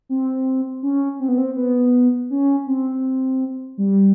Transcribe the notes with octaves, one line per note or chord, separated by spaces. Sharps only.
C4
C#4
C4
B3
C4
B3
C#4
C4
G3